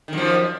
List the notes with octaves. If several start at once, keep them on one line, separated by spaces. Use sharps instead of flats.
F#2 D#3 F3